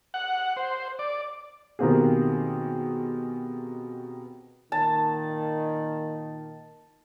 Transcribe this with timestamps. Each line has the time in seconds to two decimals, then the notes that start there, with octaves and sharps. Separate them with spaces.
0.14 F#5
0.57 C5
0.99 D5
1.79 B2 D#3 A#3 C4 G4 G#4
4.72 A#2 D#3 A5